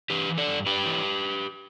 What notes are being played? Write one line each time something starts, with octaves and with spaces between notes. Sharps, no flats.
E3 G4 B4
E3
A4 D5
G2
G2 G4 B4
E3